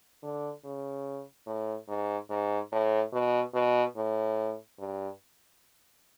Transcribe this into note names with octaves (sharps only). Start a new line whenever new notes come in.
D3
C#3
A2
G#2
G#2
A2
B2
B2
A2
G2